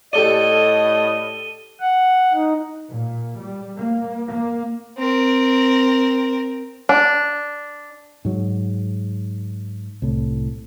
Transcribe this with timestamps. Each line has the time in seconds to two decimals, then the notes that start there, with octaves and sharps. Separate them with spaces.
0.13 A2 G4 A4 D5 D#5 D#7 G7
1.80 F#5
2.33 D#4
2.89 A#2
3.39 G3
3.77 A#3
4.26 A#3
4.98 C4 A#4
6.89 D4
8.25 G#2 F#3
10.02 C2 A2